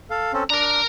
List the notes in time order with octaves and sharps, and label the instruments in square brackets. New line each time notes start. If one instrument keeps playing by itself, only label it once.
[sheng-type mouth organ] A4 F5
C4 C#4 A4
[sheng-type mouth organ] D4 [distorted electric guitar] A#4 A#5